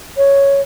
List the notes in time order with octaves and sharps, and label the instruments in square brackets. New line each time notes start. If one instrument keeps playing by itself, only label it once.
[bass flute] C#5